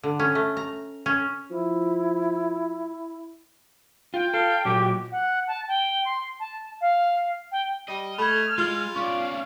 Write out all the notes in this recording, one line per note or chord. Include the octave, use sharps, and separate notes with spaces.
D3
C#4
A3
A#5
C#4
F3 E4
F4 G5
A4 F5
A#2 F#3 F#4 G4
F#5
A5
G5
C6
A5
F5
G5
G3 D#5
A3 B5 F6 G#6
G#3 F4
C#4 D5 F5 C#6